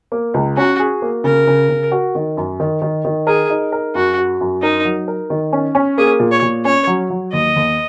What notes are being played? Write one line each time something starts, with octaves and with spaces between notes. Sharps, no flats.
A#3
C#2
C#4 F#4
G#4
A#3
C#3 A#4
C#3
C#3
F#4
D#3
F#2
D#3
D#3
D#3
G#4 A#4
D#4
A#4
F#2 F#4
F#4
F#2
D#4 A#4
F#3
A#4
D#3
C#4
C#4
A#3 G#4
A#2
C#5
A#2
C#4 C#5
F#3
F#3
D#2 D#5
D#2